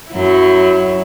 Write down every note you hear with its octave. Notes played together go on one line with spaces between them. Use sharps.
F#2 F#3 E4